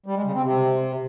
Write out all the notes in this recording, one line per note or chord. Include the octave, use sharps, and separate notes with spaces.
G3
G#3
C#3
C4
C3